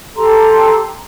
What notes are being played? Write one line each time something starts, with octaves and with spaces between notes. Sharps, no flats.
G4 A4 A#5 C6